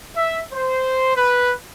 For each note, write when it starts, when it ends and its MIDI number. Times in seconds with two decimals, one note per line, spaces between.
0.16 0.40 76
0.53 1.14 72
1.16 1.52 71